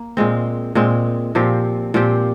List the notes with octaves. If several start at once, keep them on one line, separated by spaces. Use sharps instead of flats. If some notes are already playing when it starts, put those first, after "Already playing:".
Already playing: A#3
A#2 G#3 C4
A#2 G#3 C4
A#2 F3 C4 G4
A#2 F3 C4 G4